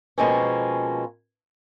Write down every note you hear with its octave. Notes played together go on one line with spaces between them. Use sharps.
B2 F3 G#3 A#3 C4 C#4